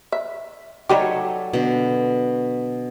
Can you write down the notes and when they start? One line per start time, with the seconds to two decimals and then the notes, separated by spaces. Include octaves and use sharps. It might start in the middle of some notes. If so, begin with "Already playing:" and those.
0.12 E5
0.89 F#3 G3 D#4 G4 A4 C#5
1.53 B2 D3